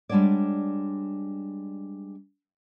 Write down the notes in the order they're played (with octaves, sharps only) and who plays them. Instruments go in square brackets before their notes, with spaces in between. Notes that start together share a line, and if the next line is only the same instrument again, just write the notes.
[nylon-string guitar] G3 G#3 D4 F#4 C#5 D5